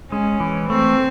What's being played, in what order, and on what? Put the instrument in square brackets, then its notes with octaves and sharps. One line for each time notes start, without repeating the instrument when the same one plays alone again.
[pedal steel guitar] G#3 [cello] C#4
[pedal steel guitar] E3
[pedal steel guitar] A3 [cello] C4